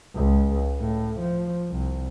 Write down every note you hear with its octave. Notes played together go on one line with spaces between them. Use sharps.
C#2
A2
F3
C2